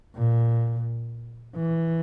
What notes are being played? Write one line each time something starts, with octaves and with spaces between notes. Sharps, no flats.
A#2
E3